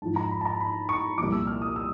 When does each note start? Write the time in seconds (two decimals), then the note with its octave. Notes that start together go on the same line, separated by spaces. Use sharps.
0.02 G#2 A5
0.05 F3
0.16 A#5
0.31 B5
0.41 A5
0.45 A#5
0.60 B5
0.89 C#6
1.18 C2 A#2 F3 D6
1.32 E6
1.47 F6
1.62 D#6
1.76 E6